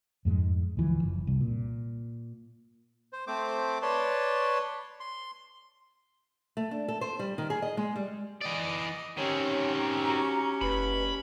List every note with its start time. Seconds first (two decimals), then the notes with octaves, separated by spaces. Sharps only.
0.25 F2 G#2 G3 G#3
0.77 D2 E3 F3
1.03 F#1
1.27 C2
1.41 A#2
3.13 C5
3.27 A3 C4 C5 D6
3.82 B4 C#5 D5 A5 C6
5.00 C6
6.57 A3
6.71 D4
6.88 A4
7.01 C5
7.19 G3
7.38 D#3
7.50 G#4
7.62 D#5
7.77 G#3
7.96 G3
8.41 E3 D5 D#5
9.17 D#3 C4 C#4 G4 C#5
9.78 A#5
10.10 F#4
10.61 F#1 B4 B5